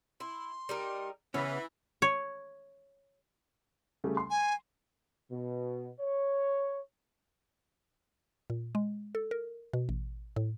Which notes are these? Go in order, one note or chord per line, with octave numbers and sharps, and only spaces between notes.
E4 C6
G3 D#4 A#4
C#3 E3 B3 C#4 B4
C#5
C#3 G3 A3
C6
G#5
B2
C#5
A#2
G#3
A4
A#4
B2
A1
A2